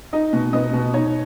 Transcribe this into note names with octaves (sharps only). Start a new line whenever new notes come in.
D#4 D#5
B2
B3 D#5
B2
D#4 C#5